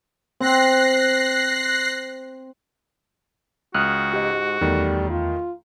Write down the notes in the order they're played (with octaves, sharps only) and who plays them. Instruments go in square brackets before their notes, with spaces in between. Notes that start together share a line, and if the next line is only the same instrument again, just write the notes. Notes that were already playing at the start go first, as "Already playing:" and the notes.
[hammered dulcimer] C4 [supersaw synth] F#6 A#6 C7
[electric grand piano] C#2 [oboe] F#4 [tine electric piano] D#6 F6 F#6
[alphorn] G#2 [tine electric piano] G4 D#5
[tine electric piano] E2 [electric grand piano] D#3 A3 [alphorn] G3
[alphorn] F4